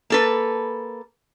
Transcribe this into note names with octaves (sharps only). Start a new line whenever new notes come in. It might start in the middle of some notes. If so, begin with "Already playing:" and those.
A#3 A4 B4